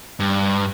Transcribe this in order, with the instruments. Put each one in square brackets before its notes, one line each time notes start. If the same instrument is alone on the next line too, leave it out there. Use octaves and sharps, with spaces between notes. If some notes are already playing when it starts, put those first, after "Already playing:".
[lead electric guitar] G2